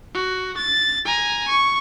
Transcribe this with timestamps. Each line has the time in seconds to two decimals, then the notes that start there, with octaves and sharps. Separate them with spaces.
0.15 F#4
0.57 A6
1.05 G#5 A#5
1.48 C#6